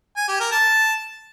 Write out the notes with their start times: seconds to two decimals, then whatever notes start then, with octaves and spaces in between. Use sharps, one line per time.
0.17 G#5
0.28 G4
0.40 A#4
0.51 A5